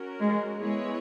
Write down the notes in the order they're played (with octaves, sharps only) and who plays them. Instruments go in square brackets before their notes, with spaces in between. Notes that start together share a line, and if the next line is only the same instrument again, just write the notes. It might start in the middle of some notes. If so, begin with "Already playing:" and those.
Already playing: [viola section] C#4 F#4 A#4
[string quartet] G#3
[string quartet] G#3 [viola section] B3 E4 G#4 C#5